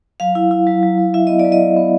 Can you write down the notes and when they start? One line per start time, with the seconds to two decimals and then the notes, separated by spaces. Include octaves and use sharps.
0.20 F#3 F5
0.35 E4
0.51 E4
0.67 F#3
0.83 F#3
0.98 F#3
1.14 E4 E5
1.27 B3 D#5
1.39 D5
1.44 F#3
1.52 D#5
1.61 E4
1.76 B3